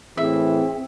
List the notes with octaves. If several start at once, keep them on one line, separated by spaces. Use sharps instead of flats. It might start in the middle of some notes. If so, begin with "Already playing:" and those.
A2 E3 C4 G#4 E5